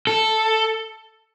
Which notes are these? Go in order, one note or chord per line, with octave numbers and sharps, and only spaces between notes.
A4